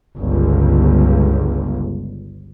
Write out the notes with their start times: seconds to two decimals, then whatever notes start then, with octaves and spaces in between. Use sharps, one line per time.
0.18 G1 C#2